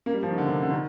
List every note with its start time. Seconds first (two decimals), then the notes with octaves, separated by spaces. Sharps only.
0.06 A#3
0.14 G3
0.23 F3
0.31 D#3
0.38 D3
0.47 C3
0.63 D3
0.71 D#3